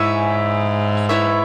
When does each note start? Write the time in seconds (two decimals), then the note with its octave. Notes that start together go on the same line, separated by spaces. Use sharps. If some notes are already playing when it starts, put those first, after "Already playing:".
Already playing: G#2 E4 C#5 E5 G#5
1.09 B3 E4 C#5 E5